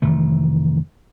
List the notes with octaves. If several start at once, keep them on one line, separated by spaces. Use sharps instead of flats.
F1 D#3 E3 A3